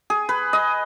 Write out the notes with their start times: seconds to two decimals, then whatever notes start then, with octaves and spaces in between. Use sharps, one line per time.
0.10 G#4
0.29 B4
0.53 D#5